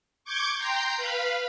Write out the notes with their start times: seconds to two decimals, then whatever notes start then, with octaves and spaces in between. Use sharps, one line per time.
0.25 C#6 D6 G6 G#6
0.56 G5 A#5 C6 G6
0.97 B4 F5 B5